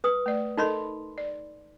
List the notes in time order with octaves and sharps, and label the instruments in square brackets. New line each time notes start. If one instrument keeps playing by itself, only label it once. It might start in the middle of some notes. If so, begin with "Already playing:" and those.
[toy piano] B4 D#6
[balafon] A3 D5
[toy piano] D#4 B5 C6 [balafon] A4 A#4 D#5
[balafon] D5